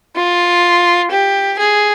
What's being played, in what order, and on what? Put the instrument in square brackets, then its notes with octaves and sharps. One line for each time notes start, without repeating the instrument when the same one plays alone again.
[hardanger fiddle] F4
G4
G#4